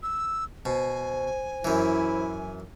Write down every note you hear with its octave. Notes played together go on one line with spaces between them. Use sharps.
E6
B2 C5 G#5
F#2 E3 E4